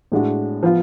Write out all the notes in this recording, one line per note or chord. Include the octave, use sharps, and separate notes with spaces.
A2 G#3 D4 F#4
F3 B3 F4